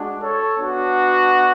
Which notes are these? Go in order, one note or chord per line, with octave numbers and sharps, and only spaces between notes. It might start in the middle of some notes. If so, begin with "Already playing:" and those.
Already playing: G#3 D4 F#4
A4 C#5
B3 D4 F#4